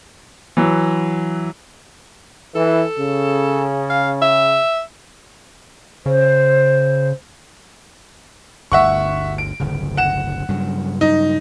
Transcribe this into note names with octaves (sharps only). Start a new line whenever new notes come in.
E3 F#3
E3 A4
C#3
F5
E5
C#3 C5
G1 D2 E5 F#5 C#6
D7
D1 G1 C#3
F#5 E7
G2 C#3 F#3
D#4